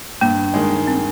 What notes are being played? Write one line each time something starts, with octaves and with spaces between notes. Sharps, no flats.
G2 A#3
D#3 G#3
C4